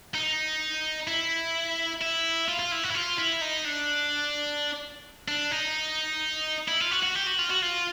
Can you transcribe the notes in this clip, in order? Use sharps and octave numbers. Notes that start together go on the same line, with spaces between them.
D#4
E4
E4
F4
F4
E4
F#4
E4
F4
E4
D#4
D4
D4
D#4
E4
F4
F#4
F#4
G4
F#4
F4
F#4
F4